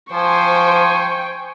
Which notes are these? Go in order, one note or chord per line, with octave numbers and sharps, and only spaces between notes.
F3 C5 G5 G#5 C#6